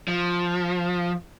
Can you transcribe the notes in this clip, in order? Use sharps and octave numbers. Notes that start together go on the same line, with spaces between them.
F3